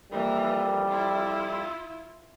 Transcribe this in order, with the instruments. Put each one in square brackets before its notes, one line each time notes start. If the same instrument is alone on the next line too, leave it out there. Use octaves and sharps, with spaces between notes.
[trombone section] F2 G3 [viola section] E3 A#3
[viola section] E4 F4